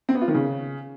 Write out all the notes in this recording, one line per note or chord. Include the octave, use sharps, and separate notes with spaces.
C4
B3
F4
D#3
C#3